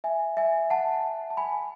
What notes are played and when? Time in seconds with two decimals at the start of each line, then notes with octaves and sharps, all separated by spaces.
0.04 E5 G#5
0.37 E5 G#5
0.70 F#5 A5
1.30 A5
1.37 G#5 B5